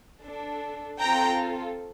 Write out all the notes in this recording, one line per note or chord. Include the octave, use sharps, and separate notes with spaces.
D4 A4
C4 F4 A4 G5 A#5